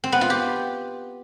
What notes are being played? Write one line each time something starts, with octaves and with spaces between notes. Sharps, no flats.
C4
B3
F4
G4